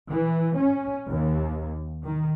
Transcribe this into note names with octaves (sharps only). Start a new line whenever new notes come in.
E3
C#4
D#2
D#3